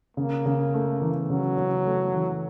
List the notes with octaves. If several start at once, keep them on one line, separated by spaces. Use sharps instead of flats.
C#3 A#3
C#3
A3
E3
C#3 F#3
C#3
A3
E3